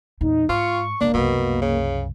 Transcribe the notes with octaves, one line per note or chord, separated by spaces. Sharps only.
E2 A#2 D#4
G#2 F4 C#6
E1 B2 A#3 D4
C2 F#2 B2
C#3